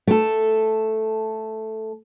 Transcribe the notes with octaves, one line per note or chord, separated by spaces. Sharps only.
A3 A4